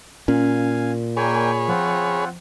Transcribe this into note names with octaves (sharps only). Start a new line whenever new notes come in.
A#2 C#4 F5 G#5
A#3 G#4 C#5 D5 G5 G#5 B5
F3 C4 F4 F#5